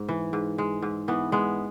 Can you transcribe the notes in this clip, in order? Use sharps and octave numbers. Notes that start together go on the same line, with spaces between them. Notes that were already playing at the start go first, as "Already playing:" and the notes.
Already playing: G#2
E3
G#2
G#3
G#2
E3 B3
G#3 B3